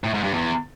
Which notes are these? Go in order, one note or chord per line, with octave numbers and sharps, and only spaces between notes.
A2
G#2
G2
E2